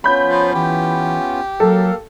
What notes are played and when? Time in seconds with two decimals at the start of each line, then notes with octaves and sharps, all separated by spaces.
0.04 B3 C#4 F4 C#5 B5 G6
0.26 F3
0.55 E3 G4
1.60 F#3 A#3 A4 A#4 F5